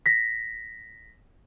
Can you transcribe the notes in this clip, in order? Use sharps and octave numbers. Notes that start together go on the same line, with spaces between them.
A#6 B6